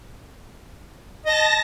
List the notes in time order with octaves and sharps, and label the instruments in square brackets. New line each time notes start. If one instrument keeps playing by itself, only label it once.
[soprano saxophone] D#5 [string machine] A5 A#6